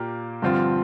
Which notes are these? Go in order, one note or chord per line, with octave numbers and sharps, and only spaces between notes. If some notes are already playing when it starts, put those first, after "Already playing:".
Already playing: A#2 A#3 G4 A#4
G2 D3 F3 C4 F4